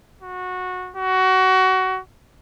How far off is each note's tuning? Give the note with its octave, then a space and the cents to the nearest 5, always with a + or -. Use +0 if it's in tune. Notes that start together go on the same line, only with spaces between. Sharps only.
F#4 -20
F#4 +20